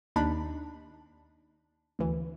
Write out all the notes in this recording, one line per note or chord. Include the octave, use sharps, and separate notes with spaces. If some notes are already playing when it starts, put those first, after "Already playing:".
D#2 D4 D#4 B5
D2 E3